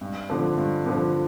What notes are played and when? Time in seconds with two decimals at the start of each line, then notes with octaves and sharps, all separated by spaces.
0.01 G2
0.30 D3 F3
0.57 G2
0.86 D3 F3